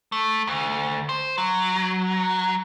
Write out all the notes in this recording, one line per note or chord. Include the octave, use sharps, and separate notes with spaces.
A3
D2
C5
F#3